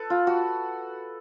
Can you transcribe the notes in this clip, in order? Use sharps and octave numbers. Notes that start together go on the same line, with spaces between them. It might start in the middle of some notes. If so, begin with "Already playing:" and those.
Already playing: A4 B4
F4
F#4